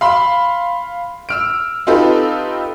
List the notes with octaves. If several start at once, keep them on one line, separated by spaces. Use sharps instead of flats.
F5 B5 C6
E6 F6 D7
C4 D#4 F4 G4 A4 B4